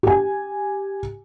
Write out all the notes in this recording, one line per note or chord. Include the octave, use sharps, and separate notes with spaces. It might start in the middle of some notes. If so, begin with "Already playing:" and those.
G4 G#5